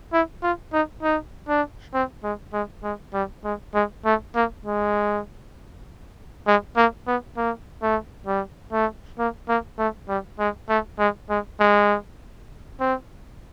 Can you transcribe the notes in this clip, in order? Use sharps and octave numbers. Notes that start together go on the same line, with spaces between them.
E4
F4
D#4
D#4
D4
C4
G#3
G#3
G#3
G3
G#3
G#3
A3
A#3
G#3
G#3
A#3
B3
A#3
A3
G3
A3
A#3
A#3
A3
G3
G#3
A3
G#3
G#3
G#3
C4